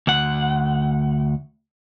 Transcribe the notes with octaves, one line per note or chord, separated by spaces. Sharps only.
D2 F#5